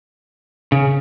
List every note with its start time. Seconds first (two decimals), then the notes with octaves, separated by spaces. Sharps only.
0.72 C#3